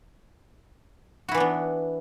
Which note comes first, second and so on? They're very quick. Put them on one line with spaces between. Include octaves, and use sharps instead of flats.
F#4 E4 E3 D4 B3